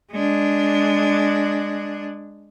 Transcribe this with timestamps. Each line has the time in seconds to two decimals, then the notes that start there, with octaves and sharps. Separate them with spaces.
0.12 G#3 D4